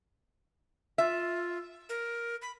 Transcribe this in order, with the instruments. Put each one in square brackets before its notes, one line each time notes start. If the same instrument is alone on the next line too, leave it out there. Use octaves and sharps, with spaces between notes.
[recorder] F4 [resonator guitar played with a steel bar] E5
[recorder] A#4
B5